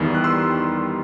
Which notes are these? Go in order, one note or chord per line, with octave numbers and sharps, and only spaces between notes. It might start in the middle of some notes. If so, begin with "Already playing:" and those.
Already playing: E2 D#3 G3 B5
F#6
C6 E6